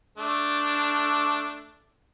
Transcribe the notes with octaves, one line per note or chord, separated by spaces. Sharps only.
A3 D4